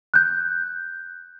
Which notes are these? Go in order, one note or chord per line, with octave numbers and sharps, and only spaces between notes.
F#6 G6